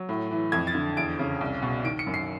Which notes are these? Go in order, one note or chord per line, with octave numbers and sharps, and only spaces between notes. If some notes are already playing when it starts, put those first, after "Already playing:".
Already playing: F#3
A2
E3
F2 G#6
A6
D3
E2 D7
C#3
C2
B2
D#3 D7
C#7
F#2
C7